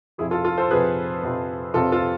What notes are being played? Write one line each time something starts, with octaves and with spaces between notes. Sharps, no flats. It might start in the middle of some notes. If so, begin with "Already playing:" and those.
F2 C3 F3 E4 G#4
F4 A4
F4 A4
A4 C5
F2 C3 F3 G#4 B4
F2 C3 F3
F2 C3 F3 F4 A4
F4 A4